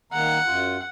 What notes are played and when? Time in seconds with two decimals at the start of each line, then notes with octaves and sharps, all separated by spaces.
0.12 D#3 A#3 F#5 A#5
0.45 F#2 F4